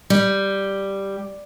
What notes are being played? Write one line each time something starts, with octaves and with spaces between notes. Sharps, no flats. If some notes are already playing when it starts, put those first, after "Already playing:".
G3